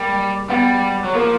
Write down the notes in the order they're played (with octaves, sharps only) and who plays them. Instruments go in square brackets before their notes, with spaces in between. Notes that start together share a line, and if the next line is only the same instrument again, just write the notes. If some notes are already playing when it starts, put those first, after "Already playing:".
Already playing: [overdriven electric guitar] G3 [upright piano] A#3
[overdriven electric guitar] G3 [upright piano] B3
[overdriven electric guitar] F#3
[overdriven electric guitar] F3 [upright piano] A#3